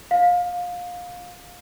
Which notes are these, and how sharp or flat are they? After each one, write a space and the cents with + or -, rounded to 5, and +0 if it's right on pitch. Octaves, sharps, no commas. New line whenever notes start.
F5 +25